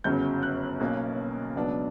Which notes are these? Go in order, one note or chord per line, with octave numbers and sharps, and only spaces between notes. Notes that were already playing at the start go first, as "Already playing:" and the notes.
G1 F#2 C#3 F#3 G6
F#6
B1 B2 A#3 C#4
C#2 B2 F#3 B3 D4